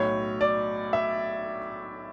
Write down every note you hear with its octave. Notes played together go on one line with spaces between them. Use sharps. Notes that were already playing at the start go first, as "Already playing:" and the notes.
Already playing: B1 A2 F#3 C#5
D5
E5